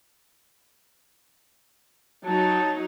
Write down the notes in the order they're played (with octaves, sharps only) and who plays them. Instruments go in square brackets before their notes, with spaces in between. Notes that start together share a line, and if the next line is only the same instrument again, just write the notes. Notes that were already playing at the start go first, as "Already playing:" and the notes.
[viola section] F#3 D#4 [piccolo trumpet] A5